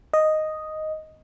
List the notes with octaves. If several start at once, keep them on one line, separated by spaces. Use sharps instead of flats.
D#5